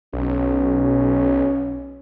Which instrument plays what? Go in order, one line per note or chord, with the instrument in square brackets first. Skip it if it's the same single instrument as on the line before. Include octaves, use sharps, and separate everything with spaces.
[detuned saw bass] B1 [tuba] C#4